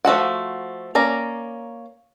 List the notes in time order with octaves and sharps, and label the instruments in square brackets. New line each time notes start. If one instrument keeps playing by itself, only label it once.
[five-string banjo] F3 A3 F#4 F#5
A#3 C#4 D5 A#5